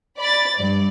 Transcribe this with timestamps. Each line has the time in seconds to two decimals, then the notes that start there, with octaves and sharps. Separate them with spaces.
0.18 D5 B5 A6
0.54 G2 D5